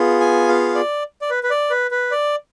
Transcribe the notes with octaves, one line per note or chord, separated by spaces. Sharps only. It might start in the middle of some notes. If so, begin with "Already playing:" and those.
Already playing: B3 F4 G#4
G#5
F5
D5
D5
B4
B4
D5
B4
B4
D5